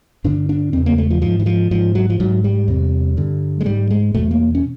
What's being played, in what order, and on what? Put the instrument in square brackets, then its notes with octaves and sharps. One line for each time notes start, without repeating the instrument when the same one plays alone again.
[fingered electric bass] G2 D3 D4
D4
E2 C#3 C4
A#3
A3
F3
G#2 F3
E3
F3
G#2 F3
F#3
F3
G#2 F#3
G3
E2 C3
G2 D3
G#3
G#2 G3
G#3
E2 B2 A3
A#3
C#4